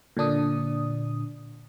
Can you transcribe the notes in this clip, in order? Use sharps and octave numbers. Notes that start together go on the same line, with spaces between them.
A#2 D3 D4 D#6